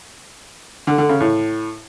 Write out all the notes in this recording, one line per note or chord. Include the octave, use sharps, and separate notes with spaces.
D3
D3
C#3
A2